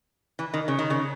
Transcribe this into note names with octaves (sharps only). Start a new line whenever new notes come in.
E3
D#3
C#3
D#3
C#3